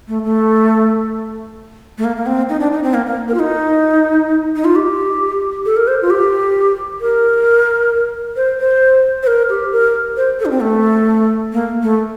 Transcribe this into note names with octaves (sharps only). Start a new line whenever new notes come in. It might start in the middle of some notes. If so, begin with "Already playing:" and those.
A3
A3
A3
A#3
A#3
C4
D#4
D4
D#4
C4
A#3
A#3
A#4
F4
D#4
D#4
F4
G4
A4
A#4
C5
F4
G4
A#4
C5
C5
C5
A#4
G4
A#4
C5
A4
D4
C4
A3
A#3
A3